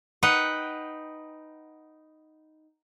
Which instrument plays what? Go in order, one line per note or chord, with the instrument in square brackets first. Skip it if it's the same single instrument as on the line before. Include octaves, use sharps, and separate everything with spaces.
[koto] D#4 B4 F#5 G5